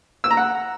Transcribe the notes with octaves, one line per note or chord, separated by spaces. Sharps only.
E6
A#5
F#5